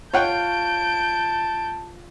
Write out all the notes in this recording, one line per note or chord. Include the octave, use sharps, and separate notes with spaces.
F4 C#5 F#5 G5 A5 G6 D7